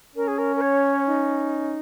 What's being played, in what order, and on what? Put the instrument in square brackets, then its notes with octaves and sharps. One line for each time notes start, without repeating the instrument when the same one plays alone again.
[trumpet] C#4 [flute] A#4
[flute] G#4
A#4
A#4
C#5
D#4